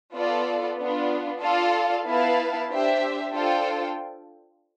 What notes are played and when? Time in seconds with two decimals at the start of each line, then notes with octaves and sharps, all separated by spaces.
0.15 B3 F4 A4 D5
0.78 B3 D4 F4
1.41 F4 A4 D5 F5 A5
2.05 B3 E4 B4 F5 A5
2.69 D4 G4 C5 E5
3.33 D4 F4 A4 C5 G5